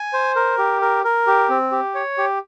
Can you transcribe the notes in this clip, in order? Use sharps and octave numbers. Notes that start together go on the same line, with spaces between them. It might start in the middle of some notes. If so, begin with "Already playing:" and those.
Already playing: G#5
C5
A#4
G4
A#4
A#4
G4
C4
G4
C#5
G4